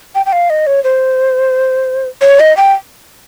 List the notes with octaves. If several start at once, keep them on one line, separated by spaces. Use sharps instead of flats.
G5
G5
F5
D#5
C#5
C5
C#5
D#5
G5